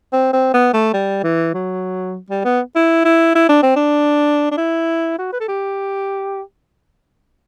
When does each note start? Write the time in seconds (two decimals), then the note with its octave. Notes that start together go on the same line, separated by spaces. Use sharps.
0.13 C4
0.33 C4
0.54 B3
0.74 A3
0.94 G3
1.24 E3
1.54 F#3
2.30 G3
2.45 B3
2.76 E4
3.05 E4
3.36 E4
3.49 D4
3.63 C4
3.76 D4
4.51 D4
4.57 E4
5.19 F#4
5.33 B4
5.40 A4
5.48 G4